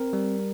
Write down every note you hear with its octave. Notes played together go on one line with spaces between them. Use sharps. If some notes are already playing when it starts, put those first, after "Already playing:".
Already playing: C4 A#4
G3